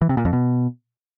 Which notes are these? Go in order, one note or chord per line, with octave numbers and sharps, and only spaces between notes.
E3
C3
A#2
F2
B2